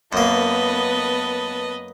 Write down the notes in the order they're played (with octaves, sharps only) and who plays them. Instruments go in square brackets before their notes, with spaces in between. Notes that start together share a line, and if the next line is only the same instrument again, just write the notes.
[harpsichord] F#2 A#3 [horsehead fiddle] B3 A5 [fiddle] B4 D#5